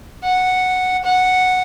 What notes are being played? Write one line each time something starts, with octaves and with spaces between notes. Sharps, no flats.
F#5
F#5